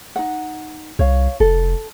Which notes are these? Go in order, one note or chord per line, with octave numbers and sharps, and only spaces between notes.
D#4 F#5
C2 C#5 F5
F1 A4